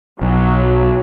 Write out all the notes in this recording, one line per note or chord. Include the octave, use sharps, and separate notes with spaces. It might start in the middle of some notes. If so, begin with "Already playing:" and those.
B1 F#3